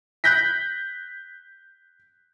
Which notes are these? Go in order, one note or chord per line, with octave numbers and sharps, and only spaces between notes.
F#6 G6 A#6 B6